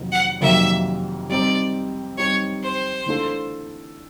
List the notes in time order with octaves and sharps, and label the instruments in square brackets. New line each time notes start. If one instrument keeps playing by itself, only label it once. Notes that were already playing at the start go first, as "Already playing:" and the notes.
Already playing: [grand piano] F2 C3 D#3 F#3 A#3
[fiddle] F#5
[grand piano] F2 C3 D#3 F#3 A#3 [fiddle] E5
[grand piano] G3 C4 D#4 [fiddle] D5
[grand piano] G3 C4 D#4 [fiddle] C#5
[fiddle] C5
[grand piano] E3 A3 D4 F4 A4